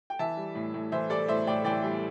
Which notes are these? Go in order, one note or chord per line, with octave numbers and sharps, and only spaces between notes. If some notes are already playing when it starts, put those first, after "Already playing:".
G5
E3 E5 A5
G3
A2
A2
E3 C5 E5
G3 A4 D5
A2 C5 E5
A2 D5 G5
E3 D5 G5
G3